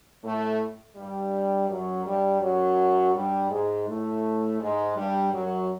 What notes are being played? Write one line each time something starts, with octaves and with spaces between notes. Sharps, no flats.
A2 A3
G2 G3
F#2 F#3
G2 G3
F#2 F#3
G2 G3
G#2 G#3
A2 A3
G#2 G#3
G2 G3
F#2 F#3